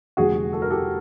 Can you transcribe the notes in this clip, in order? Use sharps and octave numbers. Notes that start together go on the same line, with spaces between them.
F1 F2 D3 G3 F#4 G#4
A4
A#4
G4 A4